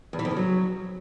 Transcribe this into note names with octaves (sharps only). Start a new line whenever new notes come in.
E2
E3
F2
C#3
F#3